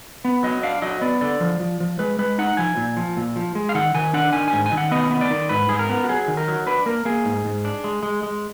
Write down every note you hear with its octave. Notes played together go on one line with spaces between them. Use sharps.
B3
F#3 D#5
D4 F5
F#3 D#5
B3 D5
D3 D5
F3
F3
F3
G#3 B4
G#3 B4
D#4 F#5
F3 G#5
A#2
F3
A#2
F3
G#3
F5
D#3 F#5
D#3 G#5
D4 F#5
D#3 G#5
G#5
G#2
G#5
D#3
F#5
B3 D#5
B3
D5
D#3
G#2 B4
G#2 G#4
A#4
B3
F#4
F#3 G#4
D#3
A#4
F#3
D4 B4
A#3 A#4
A#3 G#4
G#2
G#2
D4
G#3
G#3
G#3